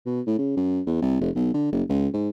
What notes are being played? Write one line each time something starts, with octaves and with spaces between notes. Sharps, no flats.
B2
A2
C#3
F#2
E2
C2
F1
B1
D3
F#1
C#2
G#2